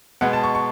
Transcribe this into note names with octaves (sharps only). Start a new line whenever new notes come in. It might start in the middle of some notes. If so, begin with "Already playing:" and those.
B2 G#3 B3 F#5
A5
C#6
C#6